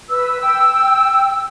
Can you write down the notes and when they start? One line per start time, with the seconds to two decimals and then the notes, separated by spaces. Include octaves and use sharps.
0.09 B4 E6
0.40 G5 E6